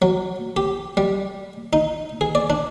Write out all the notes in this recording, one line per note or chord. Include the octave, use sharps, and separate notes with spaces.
F#3
G4
G3
D#4
G#4
D5
D4